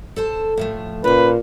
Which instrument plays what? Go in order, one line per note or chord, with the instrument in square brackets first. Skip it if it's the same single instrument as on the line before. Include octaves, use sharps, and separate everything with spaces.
[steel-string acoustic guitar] A4 C5 A5
A2 F3 A3
[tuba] A#2 [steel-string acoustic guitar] C#3 C5 [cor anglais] B4